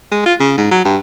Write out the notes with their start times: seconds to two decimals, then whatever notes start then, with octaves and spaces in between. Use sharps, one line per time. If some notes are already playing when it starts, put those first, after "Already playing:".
0.11 G#3
0.26 F4
0.40 C#3
0.58 G#2
0.71 F#3
0.85 G2